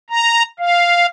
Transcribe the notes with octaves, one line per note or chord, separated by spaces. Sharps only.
A#5
F5